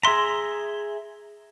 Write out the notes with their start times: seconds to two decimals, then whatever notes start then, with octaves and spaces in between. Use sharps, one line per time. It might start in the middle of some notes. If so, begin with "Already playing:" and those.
0.03 G#4 E5 A#5 C6 B6